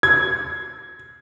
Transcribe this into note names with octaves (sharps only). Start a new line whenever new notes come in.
G#6